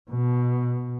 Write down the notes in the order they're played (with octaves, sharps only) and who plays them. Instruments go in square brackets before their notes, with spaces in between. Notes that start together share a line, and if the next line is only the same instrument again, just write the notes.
[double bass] B2